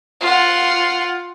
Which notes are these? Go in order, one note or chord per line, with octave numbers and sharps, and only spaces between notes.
F4 F#5